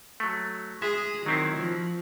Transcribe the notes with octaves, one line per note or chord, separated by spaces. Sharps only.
F#3 A3
G#3 G#4 E5
D#3 F#3 C4 E4
F3